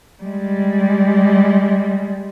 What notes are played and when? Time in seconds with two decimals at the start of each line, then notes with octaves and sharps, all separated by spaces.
0.23 G3 G#3